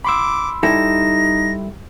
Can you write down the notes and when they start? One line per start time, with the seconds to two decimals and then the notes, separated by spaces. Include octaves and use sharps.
0.05 B5 C6 D6 E6
0.63 G3 D#4 E4 A4 A#6